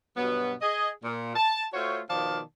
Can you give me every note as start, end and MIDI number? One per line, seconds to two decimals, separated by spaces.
0.17 0.54 43
0.17 0.54 47
0.17 0.54 54
0.17 0.54 59
0.62 0.89 68
0.62 0.89 75
1.04 1.35 46
1.36 1.65 81
1.74 2.00 57
1.74 2.00 65
1.74 2.00 66
1.74 2.00 72
1.74 2.00 73
2.10 2.40 47
2.10 2.40 51
2.10 2.40 53
2.10 2.40 74
2.10 2.40 77
2.10 2.40 81